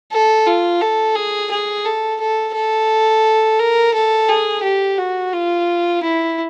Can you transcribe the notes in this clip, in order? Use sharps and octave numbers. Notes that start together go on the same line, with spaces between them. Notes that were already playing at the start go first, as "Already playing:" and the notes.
A4
F4
A4
G#4
G#4
A4
A4
A4
A#4
A4
G#4
G4
F#4
F4
E4